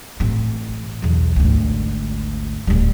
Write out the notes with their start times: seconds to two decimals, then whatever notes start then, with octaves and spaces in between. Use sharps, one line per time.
0.20 A1 C4
1.02 B1 E2
1.36 G#1 D2
2.67 D1 G3